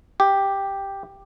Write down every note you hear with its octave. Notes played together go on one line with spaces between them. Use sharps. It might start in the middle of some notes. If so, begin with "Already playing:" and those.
G4